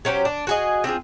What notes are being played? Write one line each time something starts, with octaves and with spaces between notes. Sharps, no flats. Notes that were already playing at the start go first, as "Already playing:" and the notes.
F#3 C#4 G4 C5
D4
F#4 G#4 D#5
C4 D4 F4 G#4